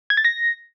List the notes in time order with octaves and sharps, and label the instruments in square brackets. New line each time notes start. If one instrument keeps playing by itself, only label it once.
[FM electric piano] G#6
A6
A#6